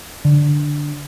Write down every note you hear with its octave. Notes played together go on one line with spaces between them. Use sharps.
D3